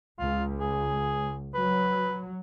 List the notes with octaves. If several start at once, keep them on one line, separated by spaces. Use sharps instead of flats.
C#2 F4
G#4
F#3 B4